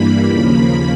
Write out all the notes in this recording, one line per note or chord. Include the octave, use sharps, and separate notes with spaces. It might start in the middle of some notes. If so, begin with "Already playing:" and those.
Already playing: G2 E3 G3 A#3 B5
D#2 C#3 F3 A#3 B5